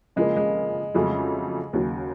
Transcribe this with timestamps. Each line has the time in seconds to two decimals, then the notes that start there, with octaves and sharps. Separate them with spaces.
0.16 C#3 F3 G#3 A#3
0.36 G#3
0.95 F2 C#3 F#3 G#3 A3 C#4
1.73 D#2 C#3 F#3